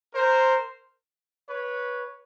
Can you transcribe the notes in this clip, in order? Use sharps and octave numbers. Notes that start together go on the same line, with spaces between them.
A#4 C5
B4 C#5